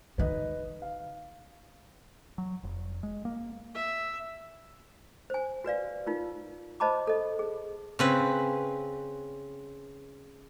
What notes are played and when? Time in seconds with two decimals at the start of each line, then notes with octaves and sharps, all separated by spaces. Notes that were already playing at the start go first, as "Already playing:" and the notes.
0.18 D3 D#4 B4 D#5
0.82 F5
2.38 F#3
2.63 F1
3.03 G#3
3.25 A#3
3.74 E5
5.30 C5 G#5
5.64 F#4 B4 D5 F5
6.06 D#4 F4 A#4
6.80 C5 D#5 A5 B5 D6
7.07 A4 D#5
7.39 G#4
7.99 C#3 C4 B4